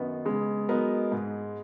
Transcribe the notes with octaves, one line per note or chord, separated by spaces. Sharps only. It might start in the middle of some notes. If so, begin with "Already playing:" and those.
Already playing: F#2 D#3 B3
C#3 G#3
F#3 B3 D#4 A#4
G#2